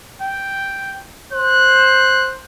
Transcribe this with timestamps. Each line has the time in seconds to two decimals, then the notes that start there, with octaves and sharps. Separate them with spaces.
0.22 G5
1.33 C5 F#6